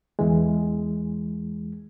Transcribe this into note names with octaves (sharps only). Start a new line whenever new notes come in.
E2 E3 G#3